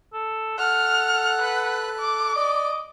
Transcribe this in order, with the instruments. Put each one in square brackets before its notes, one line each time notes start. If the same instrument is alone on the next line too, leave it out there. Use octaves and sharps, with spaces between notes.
[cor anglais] A4
[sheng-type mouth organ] A4 F#6 [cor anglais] F#5 [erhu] F6
[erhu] B4
D6
[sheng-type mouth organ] D5 [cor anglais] D#5